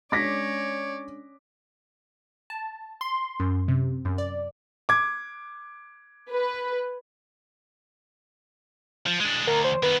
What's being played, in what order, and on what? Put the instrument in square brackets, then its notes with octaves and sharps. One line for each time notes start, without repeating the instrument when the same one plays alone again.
[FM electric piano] G#3 D4 [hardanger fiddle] C#4 D5 [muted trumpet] C#5 [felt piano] D6 A#6 B6
[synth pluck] A5
C6
F#2
C3
F#2
D5
[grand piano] D6 G#6
[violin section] B4
[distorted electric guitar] F3
G#3 D4
[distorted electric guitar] D2 [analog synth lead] A#4
[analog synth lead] C5
[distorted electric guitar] D#3 B3 [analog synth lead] B4